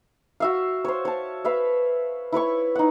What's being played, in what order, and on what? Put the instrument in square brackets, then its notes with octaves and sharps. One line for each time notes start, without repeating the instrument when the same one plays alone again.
[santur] F#4 E5 F5
C5 C#5
C#5 A5
B4 E5 F5
E4 B4 C#5 C#6
D#4 F#5